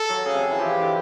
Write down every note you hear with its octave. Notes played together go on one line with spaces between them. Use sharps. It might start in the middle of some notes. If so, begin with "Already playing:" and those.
Already playing: A4
F#3
C#3 G#4
C3
E3
F3 G4
E3
D3